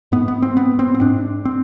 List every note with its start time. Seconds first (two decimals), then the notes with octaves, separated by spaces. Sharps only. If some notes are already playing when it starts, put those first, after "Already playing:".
0.12 G#2 B3
0.28 B3
0.42 C4
0.57 B3
0.79 C4
0.95 C4
1.01 G#2 D4
1.45 C4